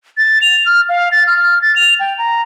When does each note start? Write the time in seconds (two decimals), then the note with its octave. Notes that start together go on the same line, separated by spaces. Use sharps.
0.18 A6
0.42 F7
0.66 F6
0.89 F5
1.12 A6
1.27 F6
1.62 A6
1.76 F7
2.00 G5
2.18 A#5